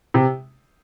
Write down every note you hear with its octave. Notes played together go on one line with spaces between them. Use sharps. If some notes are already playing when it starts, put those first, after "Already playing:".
C3